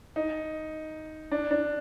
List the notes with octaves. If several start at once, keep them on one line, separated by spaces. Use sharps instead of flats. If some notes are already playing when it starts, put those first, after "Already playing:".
D#4
D4
D4